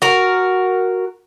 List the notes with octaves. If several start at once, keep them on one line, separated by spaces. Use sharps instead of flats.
F#4 A#4